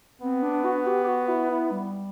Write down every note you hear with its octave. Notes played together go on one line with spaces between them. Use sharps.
B3 C4
D4
F#4
G4
G4
F#4
E4
E4
G3